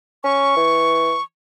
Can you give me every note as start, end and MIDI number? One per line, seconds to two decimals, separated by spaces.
0.24 0.52 61
0.24 1.22 85
0.56 1.14 52